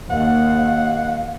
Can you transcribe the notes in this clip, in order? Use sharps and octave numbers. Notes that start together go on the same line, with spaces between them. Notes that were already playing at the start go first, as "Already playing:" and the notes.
D#2 F5 F#5